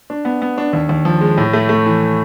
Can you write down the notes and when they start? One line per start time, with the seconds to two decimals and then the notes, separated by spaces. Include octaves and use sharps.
0.10 D4
0.25 B3
0.42 B3
0.58 D4
0.73 D#2
0.89 D#2
1.05 F3
1.21 G#3
1.37 A2
1.53 A3
1.69 A3
1.86 E3